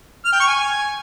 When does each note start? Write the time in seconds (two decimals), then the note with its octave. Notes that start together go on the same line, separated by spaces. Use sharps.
0.25 F6
0.32 G5
0.40 C#6
0.47 G#5